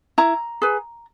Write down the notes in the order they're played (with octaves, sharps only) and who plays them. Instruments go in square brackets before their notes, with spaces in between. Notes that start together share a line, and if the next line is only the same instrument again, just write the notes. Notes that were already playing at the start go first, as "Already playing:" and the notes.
[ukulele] E4 A#5
G#4 B4